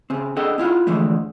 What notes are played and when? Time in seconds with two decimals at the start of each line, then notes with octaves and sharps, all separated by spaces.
0.10 C#3 C4
0.36 D4 G#4 A4 D#5 F#5 G5
0.58 C4 E4 F4 F#5
0.87 D3 E3 F3 G#3 A3